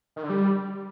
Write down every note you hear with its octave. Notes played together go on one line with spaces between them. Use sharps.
D#3
D3
G3